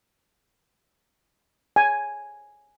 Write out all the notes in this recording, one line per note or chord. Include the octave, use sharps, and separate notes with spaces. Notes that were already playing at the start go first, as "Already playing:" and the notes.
G#5